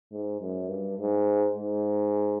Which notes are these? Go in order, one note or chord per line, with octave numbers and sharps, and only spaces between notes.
G#2
F#2
G2
G#2
G#2